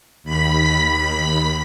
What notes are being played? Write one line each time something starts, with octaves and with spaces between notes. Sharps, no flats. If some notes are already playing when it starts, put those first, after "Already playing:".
D#2 B5 B6